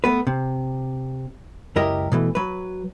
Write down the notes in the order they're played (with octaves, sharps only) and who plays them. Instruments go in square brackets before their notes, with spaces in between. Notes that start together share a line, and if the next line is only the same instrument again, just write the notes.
[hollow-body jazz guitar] A3 B3 B4
C3
C#2 F#2 E4 G4 A#4 D#5
B2 E3 A3
F#3 B4